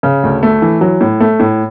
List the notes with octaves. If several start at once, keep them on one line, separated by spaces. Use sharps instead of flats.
C#3
D2
A3
E3
F#3
A2
A3
A2